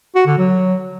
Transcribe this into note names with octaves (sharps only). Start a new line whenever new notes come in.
F#4
D3
F#3